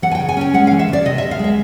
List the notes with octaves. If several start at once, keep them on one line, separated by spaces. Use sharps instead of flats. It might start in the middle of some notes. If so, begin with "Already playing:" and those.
E3 F#5
G#5
G5
C#3
G#5
C#4 G5
G#3 F#5
F5
E3
E5
C#3 D5
C3 D#5
E5
D2
F5
G#3 E5